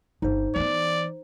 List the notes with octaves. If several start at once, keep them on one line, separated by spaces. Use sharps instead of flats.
G1 D#4 C5
E3 B3 D5